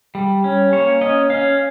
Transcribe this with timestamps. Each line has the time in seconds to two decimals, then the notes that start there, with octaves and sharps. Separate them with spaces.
0.15 G3
0.44 C#4
0.73 A#3 C#5
1.01 C#4 D#5
1.30 C#4 F5